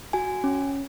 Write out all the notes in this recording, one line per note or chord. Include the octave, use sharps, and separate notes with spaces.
F#4 G#5
C#4